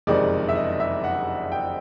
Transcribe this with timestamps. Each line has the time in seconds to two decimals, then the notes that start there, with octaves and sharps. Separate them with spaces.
0.07 F#1 F2 C3 D#3 G#3 D5
0.48 E5
0.55 D#5
0.80 E5
1.04 F#5
1.52 G5